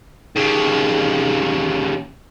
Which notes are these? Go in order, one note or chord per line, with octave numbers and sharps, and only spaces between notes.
D#2 C#3